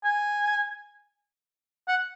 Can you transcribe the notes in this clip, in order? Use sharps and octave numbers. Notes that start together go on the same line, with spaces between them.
G#5
F#5